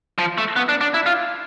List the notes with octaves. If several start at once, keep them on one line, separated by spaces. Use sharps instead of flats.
F3
A3
B3
D4
D4
E4
F4